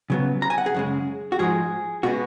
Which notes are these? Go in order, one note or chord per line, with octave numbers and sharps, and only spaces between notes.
C#3 F#3 B3
A#5
G#5
F#5
G#4
F#2 C#3 G#3
F#4
G#2 F3 G#3 G#4
B2 G#3 B3 F#4